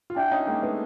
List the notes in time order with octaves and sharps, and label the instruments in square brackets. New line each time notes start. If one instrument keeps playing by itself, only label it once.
[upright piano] F4
[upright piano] D4 E4 [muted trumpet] G5
[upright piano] C#4 D#4
[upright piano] G#3 A#3 [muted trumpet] G5
[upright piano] A3 B3